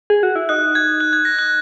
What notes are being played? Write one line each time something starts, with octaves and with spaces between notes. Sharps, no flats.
G#4
F#4
E4
D#4 F#6
G#6
F#6
G#6
A#6
F#6